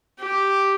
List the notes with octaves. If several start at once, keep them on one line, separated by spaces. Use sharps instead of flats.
G4